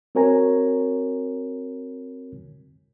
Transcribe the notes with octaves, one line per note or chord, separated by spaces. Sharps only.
C4 F#4 A#4 C#5 G#5 A#5